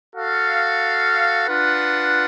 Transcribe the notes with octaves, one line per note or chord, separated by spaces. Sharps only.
F#4 A4 F5
D4 F4 B4 F#5